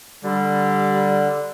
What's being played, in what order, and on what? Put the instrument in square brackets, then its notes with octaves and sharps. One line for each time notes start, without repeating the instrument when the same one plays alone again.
[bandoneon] D3 [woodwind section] G3